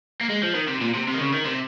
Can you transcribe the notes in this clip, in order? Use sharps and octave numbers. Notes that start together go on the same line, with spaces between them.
A#3
G#3
F3
D#3
C3
A#2
C3
C3
D#3
C#3
D#3
C3